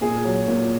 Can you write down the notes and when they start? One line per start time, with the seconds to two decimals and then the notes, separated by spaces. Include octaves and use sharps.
0.01 A#2 G#4
0.24 F#3
0.48 A#2